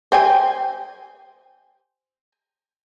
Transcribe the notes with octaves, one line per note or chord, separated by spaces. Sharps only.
C5 G5 G#5